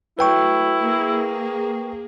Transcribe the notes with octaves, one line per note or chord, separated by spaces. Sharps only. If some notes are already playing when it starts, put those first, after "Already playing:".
F#3 A3 E4 B4 G5 C#6
A#3 G#4